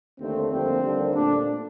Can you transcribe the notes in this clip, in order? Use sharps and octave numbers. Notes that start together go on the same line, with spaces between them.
D#2 D3 A3 C4
F2 D3 G3 A#3 C4
D#2 D3 G3 A#3
A#2 A3 D4